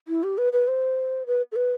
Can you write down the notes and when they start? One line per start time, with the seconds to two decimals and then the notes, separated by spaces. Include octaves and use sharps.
0.08 E4
0.23 G4
0.38 B4
0.53 B4
0.68 C5
1.26 B4
1.52 A4
1.56 B4